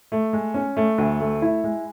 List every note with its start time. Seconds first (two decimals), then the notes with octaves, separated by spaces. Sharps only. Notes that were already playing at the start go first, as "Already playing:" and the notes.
0.12 A3
0.33 G#3
0.54 C#4
0.77 A3
0.98 D2
1.20 A3
1.42 E4
1.64 G#3